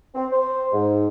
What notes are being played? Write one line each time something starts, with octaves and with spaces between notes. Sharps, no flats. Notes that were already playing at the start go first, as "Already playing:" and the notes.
C4
C5
G#2